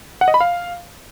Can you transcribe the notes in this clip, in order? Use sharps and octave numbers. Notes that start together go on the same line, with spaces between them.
F#5
D#5
B5
F5